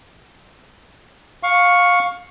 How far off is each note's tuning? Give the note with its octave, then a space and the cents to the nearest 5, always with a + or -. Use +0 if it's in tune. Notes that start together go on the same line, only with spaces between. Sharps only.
F5 +20 C#6 +0